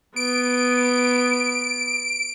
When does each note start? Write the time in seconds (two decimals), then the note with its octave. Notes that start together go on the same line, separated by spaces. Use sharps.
0.16 B3 D7